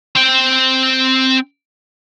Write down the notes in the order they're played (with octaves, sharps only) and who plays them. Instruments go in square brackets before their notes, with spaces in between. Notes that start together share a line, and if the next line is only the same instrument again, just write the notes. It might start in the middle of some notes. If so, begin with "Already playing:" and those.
[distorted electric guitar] C4 G5